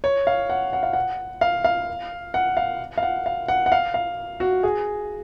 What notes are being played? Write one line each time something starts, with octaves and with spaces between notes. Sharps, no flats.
C#5
F5
F#5
F#5
F5
F#5
F5
F5
F#5
F5
F5
F#5
F5
F#5
F#5
F5
F5
F#4
G#4